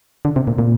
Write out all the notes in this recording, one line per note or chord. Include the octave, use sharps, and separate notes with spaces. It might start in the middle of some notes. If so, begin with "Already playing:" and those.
D3
C3
A#2
A#2